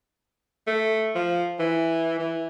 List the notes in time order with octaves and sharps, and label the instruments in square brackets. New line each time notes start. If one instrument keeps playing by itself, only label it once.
[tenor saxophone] A3
F3
E3
E3